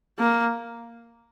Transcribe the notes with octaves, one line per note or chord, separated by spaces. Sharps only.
A#3